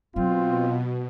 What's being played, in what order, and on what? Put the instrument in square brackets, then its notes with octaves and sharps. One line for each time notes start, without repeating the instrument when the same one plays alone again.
[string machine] B2 [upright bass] F#3 E4 [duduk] C4 [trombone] F4